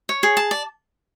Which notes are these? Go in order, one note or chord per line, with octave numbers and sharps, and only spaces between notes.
C#5
G#4
A5
D5